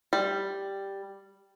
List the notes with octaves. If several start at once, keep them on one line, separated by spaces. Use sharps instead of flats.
G3